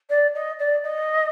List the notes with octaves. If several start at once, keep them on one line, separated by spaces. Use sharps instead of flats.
D5
D#5
D5
D#5